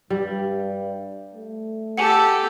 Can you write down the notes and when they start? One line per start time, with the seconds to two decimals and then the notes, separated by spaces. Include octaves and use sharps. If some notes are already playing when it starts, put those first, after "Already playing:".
0.10 G2 G3
1.34 A3
1.97 G4 A4 F#5 G#5 A5